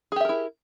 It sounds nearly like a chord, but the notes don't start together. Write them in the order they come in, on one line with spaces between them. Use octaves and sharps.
G#4 G4 E5 A#4 E4